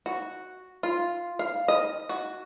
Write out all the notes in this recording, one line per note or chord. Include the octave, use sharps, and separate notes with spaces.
F#4
F4
F5
D#5
F#4